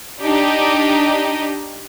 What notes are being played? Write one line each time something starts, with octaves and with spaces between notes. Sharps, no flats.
D4 D#4 G4 D#5